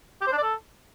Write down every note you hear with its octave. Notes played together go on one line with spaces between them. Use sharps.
G4
C5
D4
D5
A4